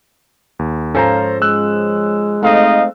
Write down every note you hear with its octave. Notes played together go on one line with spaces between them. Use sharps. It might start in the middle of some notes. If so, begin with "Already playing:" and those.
D#2
G#2 F3 C#4 A4 C5 A#5
G#3 E6 F#6
A3 C4 D#4 D#5 F5